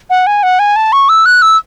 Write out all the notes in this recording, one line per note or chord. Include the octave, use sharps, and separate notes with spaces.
F#5
G#5
F#5
G#5
A5
C#6
E6
F#6
E6